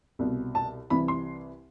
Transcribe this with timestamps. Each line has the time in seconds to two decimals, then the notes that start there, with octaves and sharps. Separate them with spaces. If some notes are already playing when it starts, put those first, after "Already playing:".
0.19 C2 B2
0.55 A5
0.90 C2 C3 E3 B5
1.08 C6